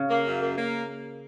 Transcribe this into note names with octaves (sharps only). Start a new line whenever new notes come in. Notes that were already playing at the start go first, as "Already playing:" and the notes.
Already playing: C#3
A#3
F#2
A#3
A#3